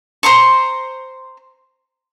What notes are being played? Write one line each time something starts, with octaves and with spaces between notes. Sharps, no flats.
C5 A#5 C6 C#6